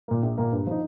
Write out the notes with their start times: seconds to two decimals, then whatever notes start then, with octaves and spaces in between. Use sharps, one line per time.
0.08 A#2 A#3
0.22 A#1
0.38 A#2 A#3
0.52 G2
0.66 F3 D#4